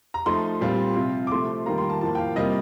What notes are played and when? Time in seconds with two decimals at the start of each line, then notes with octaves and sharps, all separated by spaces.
0.14 A#5
0.26 F3 A3 D#4 C6
0.61 A#2 G3 C4 F4
0.96 C3 F3 C4 F4
1.27 D6
1.31 C3 F3 A3 C6
1.66 D#3 G3 A#3 F4 A#5
1.78 C6
1.90 A5
2.01 A2 F3 A#3 A5
2.15 G5
2.18 F5
2.36 C3 G3 A#3 F4 D#5